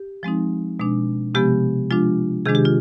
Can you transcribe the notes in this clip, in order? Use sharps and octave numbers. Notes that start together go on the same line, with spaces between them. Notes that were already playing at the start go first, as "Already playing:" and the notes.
Already playing: G4
F3 G#3 C4 D#4
B2 G#3 D4
C3 F3 G#3 B3 G4
F3 G#3 D4 F4
C3 D#3 G#3 D4 G#4
G4
F4